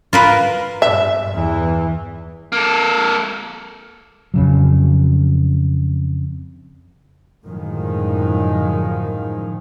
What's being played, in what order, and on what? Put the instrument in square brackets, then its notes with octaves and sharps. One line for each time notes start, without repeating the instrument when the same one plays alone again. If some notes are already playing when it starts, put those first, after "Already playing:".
[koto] F4 A#4 B4
[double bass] G2 [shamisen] E5
[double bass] E2 E3
[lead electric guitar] A#3 A4
[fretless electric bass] F2 C#3 F#3
[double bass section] F#2 A2 D3 D#3 F3 G#3